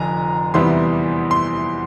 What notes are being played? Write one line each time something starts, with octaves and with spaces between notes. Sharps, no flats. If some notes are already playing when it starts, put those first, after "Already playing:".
Already playing: F1 F2 D3 G#5 A#5
E2 C3 E3 G3 B3 C6
C6